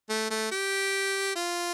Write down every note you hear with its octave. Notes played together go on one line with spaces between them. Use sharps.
A3
A3
G4
F4